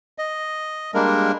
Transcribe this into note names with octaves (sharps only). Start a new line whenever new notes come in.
D#5
G3 G#3 A#3 D4 A#4